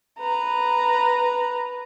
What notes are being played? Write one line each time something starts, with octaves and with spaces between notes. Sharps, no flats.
B4 A#5